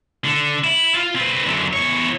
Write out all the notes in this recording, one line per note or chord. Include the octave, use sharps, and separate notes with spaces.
D3
E4
F4 F5
C4 B4
F#2 D3
E2 C#5